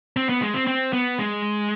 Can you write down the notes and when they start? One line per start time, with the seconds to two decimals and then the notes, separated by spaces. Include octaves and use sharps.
0.17 C4
0.29 B3
0.42 G#3
0.54 C4
0.67 C4
0.93 B3
1.18 G#3